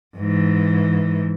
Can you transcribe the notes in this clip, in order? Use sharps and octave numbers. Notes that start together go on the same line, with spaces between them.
G#2 E3